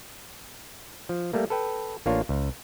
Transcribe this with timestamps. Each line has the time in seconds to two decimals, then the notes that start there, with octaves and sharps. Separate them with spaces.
1.09 F3
1.33 G3 A3 A#3
1.50 A4 B4 G5
2.06 A1 A#3 D4 F4 C#5
2.29 C#2